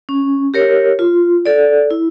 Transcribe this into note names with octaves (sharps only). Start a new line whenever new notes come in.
C#4
G4 A#4 C#5
F4
A4 D5
E4